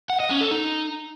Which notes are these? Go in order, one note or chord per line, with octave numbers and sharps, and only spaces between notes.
F#5
D#5
C#4
A4
D#4